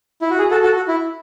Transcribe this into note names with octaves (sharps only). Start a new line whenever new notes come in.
E4
F#4
G#4
F#4 A4
F#4 A4
F#4
E4